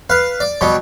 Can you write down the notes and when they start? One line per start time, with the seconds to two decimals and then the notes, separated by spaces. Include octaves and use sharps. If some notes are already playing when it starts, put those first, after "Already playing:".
0.10 B4 F5
0.40 D5
0.61 B2 F#3 G3